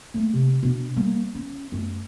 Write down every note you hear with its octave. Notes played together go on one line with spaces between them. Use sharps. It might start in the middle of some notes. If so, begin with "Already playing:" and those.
A3 A#3
C3
B2 D4
G3 A#3
C#4
F#2 A3